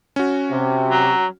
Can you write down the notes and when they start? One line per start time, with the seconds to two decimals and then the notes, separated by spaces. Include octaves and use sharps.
0.16 C#4 F#4
0.51 C3
0.90 F#3